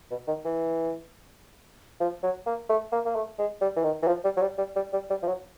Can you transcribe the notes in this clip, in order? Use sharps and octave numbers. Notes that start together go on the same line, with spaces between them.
B2
D#3
E3
F3
F#3
A#3
A3
A#3
A#3
A3
G#3
G3
E3
D#3
E3
F3
G3
F#3
G3
G3
G3
G3
G3
F3
F#3